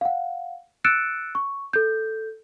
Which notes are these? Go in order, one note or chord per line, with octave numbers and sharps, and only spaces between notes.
F5 F#5
E6 F#6 A6 C#7 D7 E7
C#6
A4 G6